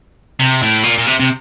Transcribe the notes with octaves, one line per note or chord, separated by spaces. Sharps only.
C3
A2
A#2
A#2
C3
C3